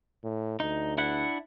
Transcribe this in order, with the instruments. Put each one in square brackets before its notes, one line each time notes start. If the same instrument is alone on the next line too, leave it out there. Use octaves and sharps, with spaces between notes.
[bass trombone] A2
[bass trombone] D2 [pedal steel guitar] D#4
[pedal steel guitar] D4 E4 F#5